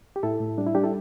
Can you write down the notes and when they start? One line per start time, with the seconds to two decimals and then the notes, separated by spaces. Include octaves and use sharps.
0.16 G4
0.23 A2 E4 A4
0.40 A2
0.58 G3 D4
0.66 E4
0.75 G3 D4 G4
0.83 E4 A4